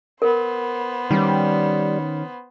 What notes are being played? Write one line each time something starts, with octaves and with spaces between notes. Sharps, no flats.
B3 A#4 C5
D#3 G3 C#4